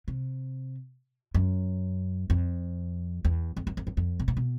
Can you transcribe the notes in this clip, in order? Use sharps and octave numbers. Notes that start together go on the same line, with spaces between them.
C3
F#2
F2
E2
F2
F#2
F2
F#2
F2
B2
A#2
B2